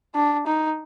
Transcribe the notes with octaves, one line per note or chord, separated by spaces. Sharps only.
D4
D#4